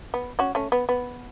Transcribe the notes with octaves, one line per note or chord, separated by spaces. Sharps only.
B3
C#4 F#4
A3 C#4
B3
B3